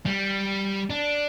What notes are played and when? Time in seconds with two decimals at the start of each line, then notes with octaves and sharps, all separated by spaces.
0.06 G3
0.90 D4